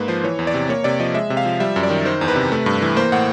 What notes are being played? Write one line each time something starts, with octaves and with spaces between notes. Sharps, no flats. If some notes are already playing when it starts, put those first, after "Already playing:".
Already playing: G#2 A#3 B4
F3 C5
E3 C#5
E2
D5
C3
A#3 C#5
C3 D5
F3 D#5
G#3 E5
C3
F5
F3
G3 E5
F#2
D5
D#3
D#3 C5
E2
B4
C3
A3
G2
E3
A#3 C5
A2 F#5